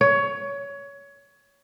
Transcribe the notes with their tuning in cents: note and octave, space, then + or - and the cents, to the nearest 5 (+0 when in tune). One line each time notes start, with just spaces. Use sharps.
C#5 +20